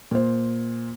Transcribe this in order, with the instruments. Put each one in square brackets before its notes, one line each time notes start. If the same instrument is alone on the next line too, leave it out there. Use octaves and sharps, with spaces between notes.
[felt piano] A#2 C5